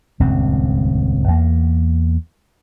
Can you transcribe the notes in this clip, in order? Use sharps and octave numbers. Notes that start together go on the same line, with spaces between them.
D#1 C#2 G2 C4
E2 A#3